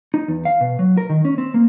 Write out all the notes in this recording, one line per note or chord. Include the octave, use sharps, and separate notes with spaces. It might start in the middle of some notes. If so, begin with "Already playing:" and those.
D#4
E2
F5
B2
F#3
A#4
D#3
C#4
C4
A#3